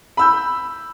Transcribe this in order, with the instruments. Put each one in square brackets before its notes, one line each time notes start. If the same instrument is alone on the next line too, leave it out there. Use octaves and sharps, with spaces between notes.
[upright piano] B5 E6 G6